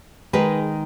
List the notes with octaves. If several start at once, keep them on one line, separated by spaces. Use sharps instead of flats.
D#3 G#3 D#4 G#4 B4